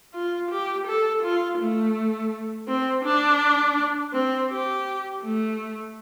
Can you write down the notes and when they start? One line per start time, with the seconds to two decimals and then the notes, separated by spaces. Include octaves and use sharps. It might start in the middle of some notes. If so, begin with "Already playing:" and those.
0.14 F4
0.50 G4
0.87 A4
1.22 F4
1.59 A3
2.68 C4
3.04 D4
4.13 C4
4.50 G4
5.22 A3